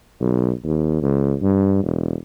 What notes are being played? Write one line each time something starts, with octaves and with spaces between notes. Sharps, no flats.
B1
D#2
C#2
G2
E1